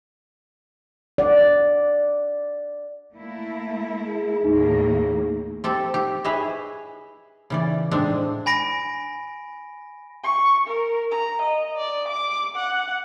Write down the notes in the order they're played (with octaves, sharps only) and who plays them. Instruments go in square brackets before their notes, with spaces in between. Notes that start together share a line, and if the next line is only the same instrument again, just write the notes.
[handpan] D5 F#5
[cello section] A3 A#3 E4
[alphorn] G#4
[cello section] D#2 A2 A#3 [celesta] D#4
[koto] C4 G4 A4
G4
E4 G#4 B4 C#5 D#5 E5
C#3 E3 D5
A2 G#3 C4 D4
[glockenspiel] G#5 B5 A#6 D7
[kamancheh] C#6
A#4
A#5
D#5
D5
D6
F#5